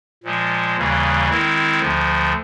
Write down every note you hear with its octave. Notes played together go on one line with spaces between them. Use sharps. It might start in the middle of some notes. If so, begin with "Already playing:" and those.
A#2 F3 G#3
D#2 C#3 E3 G3
D#3 G#3 C4 E4
D2 D3 F3